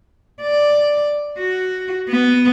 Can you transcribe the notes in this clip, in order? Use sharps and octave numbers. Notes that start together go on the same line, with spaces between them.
D5
F#4
B3